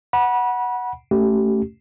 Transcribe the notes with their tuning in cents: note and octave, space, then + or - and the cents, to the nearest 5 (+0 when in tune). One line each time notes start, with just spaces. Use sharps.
F#5 +0 B5 -30
A3 +0 C#4 +0 G4 -25